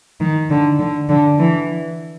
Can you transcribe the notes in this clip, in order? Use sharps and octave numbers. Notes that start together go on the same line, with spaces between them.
D#3
D3
D3
D3
E3